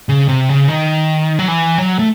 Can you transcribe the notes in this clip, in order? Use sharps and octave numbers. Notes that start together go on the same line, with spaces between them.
C#3
C3
C#3
D#3
F#3
E3
F#3
A3